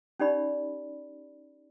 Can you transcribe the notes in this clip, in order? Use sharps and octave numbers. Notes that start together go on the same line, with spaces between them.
C#4 D#4 G4 D5 B5